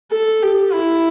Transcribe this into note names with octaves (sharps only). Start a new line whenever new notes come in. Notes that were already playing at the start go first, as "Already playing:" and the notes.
A4
G4
E4